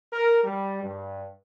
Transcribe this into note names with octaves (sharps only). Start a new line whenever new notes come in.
A#4
G3
G2